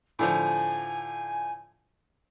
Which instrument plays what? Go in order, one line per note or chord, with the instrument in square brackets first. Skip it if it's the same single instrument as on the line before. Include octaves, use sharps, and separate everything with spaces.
[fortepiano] A2 D3 F3 [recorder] G#5